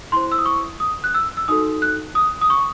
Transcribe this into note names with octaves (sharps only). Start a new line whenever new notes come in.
E4 C5 C6
E6
D#6
C#6
D#6
F#6
E6
E6
D#4 F#4 A4 D#6
F#6
D#6
D#6
C#6